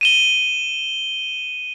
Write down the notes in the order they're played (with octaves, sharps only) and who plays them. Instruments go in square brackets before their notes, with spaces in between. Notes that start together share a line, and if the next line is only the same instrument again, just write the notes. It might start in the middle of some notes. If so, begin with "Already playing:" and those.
[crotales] D#7 E7 G7